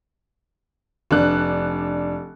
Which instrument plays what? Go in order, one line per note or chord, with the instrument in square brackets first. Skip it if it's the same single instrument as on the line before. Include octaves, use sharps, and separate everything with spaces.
[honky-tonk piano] F1 D4 F#6